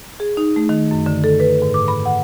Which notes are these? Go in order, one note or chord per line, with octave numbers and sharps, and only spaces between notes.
G#4
D#4
A3
D#3
F#2
D3
A4
B4
G#2
D6
B5
F#5